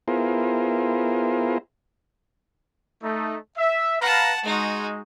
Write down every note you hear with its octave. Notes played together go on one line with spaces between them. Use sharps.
B3 E4 F4 G#4 A#4 C5
A3 D#4
E5
B4 F5 F#5 A5 A#5
G#3 D#4 F#4